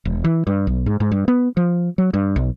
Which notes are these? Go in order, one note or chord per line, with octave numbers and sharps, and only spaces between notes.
E1
E3
G2
B1
G#2
G#2
G2
B3
F3
F#3
G2
B1